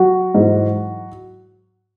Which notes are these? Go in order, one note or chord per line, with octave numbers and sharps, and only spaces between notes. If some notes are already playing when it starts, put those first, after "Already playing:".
Already playing: F#3 F#4
G#2 E3